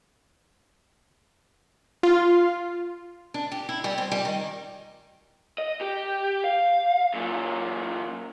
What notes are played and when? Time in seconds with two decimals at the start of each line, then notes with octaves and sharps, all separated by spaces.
2.03 F4
3.34 D4
3.52 G4
3.69 E4
3.84 G3
3.98 C4
4.12 G3
4.25 D#3
5.58 D#5
5.81 G4
6.44 F5
7.14 F#2 A#2